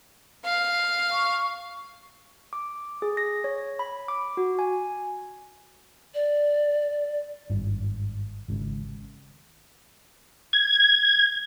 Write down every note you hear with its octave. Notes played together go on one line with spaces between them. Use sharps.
F5
C#6
D6
G#4
A#6
C#5
B5
D6
F#4
G#5
D5
G#1 G2
G#1 G#2 C#3
G#6